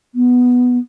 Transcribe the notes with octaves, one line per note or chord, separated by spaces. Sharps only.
B3